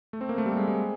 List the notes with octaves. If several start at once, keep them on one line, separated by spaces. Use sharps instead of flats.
A3
C4
A#3
A3
G3
G#3
G#3